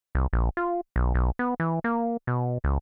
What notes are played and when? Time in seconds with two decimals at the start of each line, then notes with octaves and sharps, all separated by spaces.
0.15 C2
0.33 A#1
0.57 F4
0.96 B1
1.15 B1
1.39 B3
1.60 E3
1.84 A#3
2.27 B2
2.64 C#2